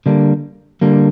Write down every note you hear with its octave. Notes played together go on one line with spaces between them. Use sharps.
D3 G3 A#3 D4
D3 G3 A#3 D4